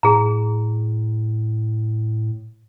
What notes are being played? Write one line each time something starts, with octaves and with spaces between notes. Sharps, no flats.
A2 G#4 A#5